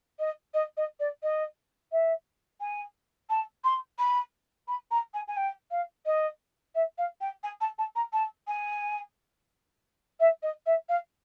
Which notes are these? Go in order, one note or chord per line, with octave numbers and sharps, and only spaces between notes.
D#5
D#5
D#5
D5
D#5
E5
G#5
A5
C6
B5
B5
A#5
G#5
G#5
G5
F5
D#5
E5
F5
G5
G#5
A5
A5
A#5
A5
G#5
E5
D#5
E5
F5